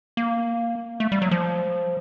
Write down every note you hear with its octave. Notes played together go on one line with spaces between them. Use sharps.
A#3
A3
G3
F#3
F3